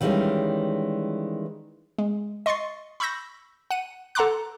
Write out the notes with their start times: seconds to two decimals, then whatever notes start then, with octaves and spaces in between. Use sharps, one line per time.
0.01 D#3 E3 G3 G#3 A#3 C#4
1.98 G#3
2.46 D#5 C6 C#6 A6 C7
3.00 B5 C#6 E6 G6 A#6
3.71 F#5 D#7
4.15 A4 F#5 A#5 C6 D6 F#6